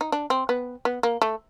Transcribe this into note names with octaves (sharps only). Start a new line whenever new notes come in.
D#4
D4
C4
B3
B3
A#3
A3